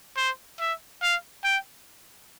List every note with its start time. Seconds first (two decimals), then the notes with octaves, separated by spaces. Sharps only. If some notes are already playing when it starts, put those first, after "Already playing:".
0.17 C5
0.60 E5
1.02 F5
1.44 G5